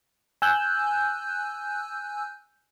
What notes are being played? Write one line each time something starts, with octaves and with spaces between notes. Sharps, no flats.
G#5 E6 F#6 G6